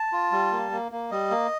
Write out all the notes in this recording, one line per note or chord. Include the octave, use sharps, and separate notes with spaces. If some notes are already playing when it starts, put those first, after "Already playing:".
Already playing: A5
F4
G3
A#3
A#3
A#3
G3 D#5
A#3